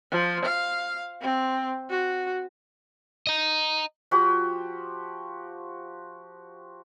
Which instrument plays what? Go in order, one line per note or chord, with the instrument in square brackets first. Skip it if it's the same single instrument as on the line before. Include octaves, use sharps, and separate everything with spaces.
[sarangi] F3
F5
C4
F#4
[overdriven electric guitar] D#5 A#5
[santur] F3 F#4 G4